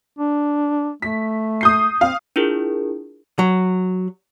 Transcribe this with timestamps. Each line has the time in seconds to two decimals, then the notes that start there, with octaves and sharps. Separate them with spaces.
0.19 D4
1.02 A3 B6
1.61 D#6 G6 C7
2.01 C4 F5
2.36 D4 E4 F4 G#4 A#4
3.39 F#3